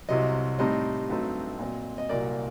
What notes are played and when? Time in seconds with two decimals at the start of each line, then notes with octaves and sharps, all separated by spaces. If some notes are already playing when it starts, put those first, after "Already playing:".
0.09 C2 C3 F#3 D#5
0.59 A2 G3 C4 D#4 D#5
1.09 G2 F#3 A3 C4 D#4
1.59 A#2 F#3 C4
1.98 D#5
2.09 C2 A#2 F#3 A#3 D5